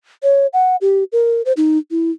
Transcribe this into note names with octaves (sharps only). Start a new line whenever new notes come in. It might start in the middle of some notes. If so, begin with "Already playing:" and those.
C#5
F#5
G4
A#4
C5
D#4
E4